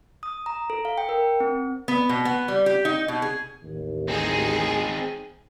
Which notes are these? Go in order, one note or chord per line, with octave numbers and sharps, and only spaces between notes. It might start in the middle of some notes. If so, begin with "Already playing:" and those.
D#6
A#5
A4
F5
G5
A#4
C4
B3
B2
B3
G3
G4
D#4
B2
G#4
A1 D#2
C4 D#4 G#4